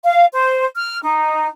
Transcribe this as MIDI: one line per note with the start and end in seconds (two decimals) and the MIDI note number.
0.04 0.24 77
0.32 0.63 72
0.75 0.98 89
1.03 1.47 63